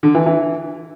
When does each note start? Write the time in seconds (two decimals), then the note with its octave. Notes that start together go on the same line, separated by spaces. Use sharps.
0.03 D3
0.15 E3
0.26 E3